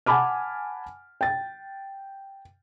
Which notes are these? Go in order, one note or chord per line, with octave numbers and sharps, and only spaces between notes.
F#5 G#5 A5 B5 D6 F6
G5 A6